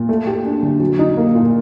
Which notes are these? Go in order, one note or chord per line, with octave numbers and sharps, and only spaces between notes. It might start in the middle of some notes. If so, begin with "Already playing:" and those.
Already playing: A#2
A3
G4
D4
D3
F#3
D#4
A#3
A#2